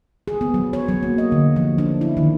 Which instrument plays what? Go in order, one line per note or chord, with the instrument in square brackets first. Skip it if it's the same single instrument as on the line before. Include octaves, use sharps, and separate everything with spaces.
[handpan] G#4
B3
F#3
C#5
F#3
A#3
D#5
D3
F3
D4
E4
D#3